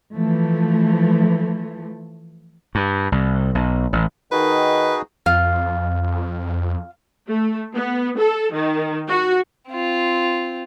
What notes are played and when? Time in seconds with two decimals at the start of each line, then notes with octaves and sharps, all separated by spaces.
0.13 E3 F3 A3
2.75 G2
3.12 C2
3.55 B1
3.93 A1
4.32 D#3 D#4 F#4 G#4 B4
5.26 F2 F4
7.28 A3
7.74 B3
8.18 A4
8.53 D#3
9.08 F#4
9.69 C4 F4